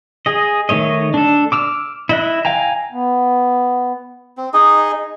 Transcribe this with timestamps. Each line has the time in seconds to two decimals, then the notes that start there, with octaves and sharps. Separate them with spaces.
0.26 G#4 D#5
0.69 D#3 A3 C#5 D#5
1.14 D4 A4
1.52 D6 E6 F6
2.09 E4 D#5 F#6
2.45 F5 G5 G#5 A#5
2.92 B3
4.37 C4
4.53 D#4 G#4 D#5